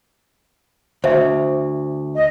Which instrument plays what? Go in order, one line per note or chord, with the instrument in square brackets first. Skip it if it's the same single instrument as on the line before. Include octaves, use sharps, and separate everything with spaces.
[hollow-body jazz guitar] D2 [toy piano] C5 E5
[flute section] D#5